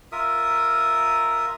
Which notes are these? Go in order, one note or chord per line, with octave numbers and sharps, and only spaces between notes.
F4 A#4 E5 D#6